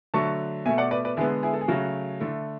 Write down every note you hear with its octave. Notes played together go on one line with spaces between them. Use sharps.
D3 F#3 A3 A5 C#6
B2 A3 E5 G#5
D5 F#5
B4 D5
B4 D5
D3 G#3 B3 E4 G#4
E4 G#4
A4
G#4
C#3 F#3 A3 F#4
D3 A3 E4